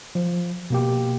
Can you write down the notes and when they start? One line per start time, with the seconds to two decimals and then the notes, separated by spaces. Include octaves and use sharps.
0.15 F3
0.70 B2 A#3 G4